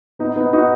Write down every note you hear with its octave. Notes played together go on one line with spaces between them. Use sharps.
B3 D#4
B3 D#4
D#4 F#4